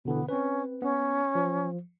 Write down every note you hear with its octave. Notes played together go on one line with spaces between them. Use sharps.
B2 D3 E3 B3
C4 C#4 B4
B3 C#4
F3